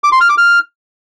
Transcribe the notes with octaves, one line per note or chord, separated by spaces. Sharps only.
D6
C6
F6
D6
F6